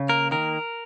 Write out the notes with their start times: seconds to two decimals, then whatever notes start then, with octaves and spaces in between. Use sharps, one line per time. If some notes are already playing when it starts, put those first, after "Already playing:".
Already playing: C#3
0.09 A#3 A#4
0.31 D#3 A#4